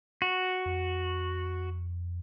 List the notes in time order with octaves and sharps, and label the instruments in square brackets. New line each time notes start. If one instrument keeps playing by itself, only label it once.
[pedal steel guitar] F#4
[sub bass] F2